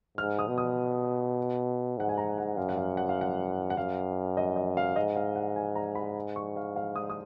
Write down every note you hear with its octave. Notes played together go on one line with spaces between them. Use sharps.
G#2 F6
D#6
B2
D#6
G#2 F#5
G#5
A#5
F#5
F#2 F5
F#5
F5
F#5
F5
F#5
F#5
F#2 F5
D#5
D#5
F5
G#2 D#5
F5
F#5
G#5
A#5
B5
C#6
F5
F5
D#6
D#6